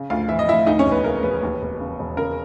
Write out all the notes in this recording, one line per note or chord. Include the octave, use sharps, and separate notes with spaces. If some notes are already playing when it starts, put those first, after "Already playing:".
Already playing: C#3
D2 F4 F5
E3 E5
D#5
D2 E4 E5
D2 D#4 D#5
C#4 C#5
E1
B3 B4
C#3 A#4
E1 B3 B4
D#2
E1
C#3
E1
C#3 A#4